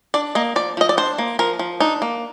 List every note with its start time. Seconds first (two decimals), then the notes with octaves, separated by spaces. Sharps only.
0.14 D4 D5
0.35 A#3 D#5
0.56 F3 D5
0.77 F3 D#5
0.89 D5
0.97 D4 C5
1.18 A#3
1.39 F3 A#4
1.59 F3
1.80 D4 D#4
2.02 A#3